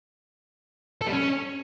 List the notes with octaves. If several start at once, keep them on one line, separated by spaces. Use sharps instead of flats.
A4
G3
C#4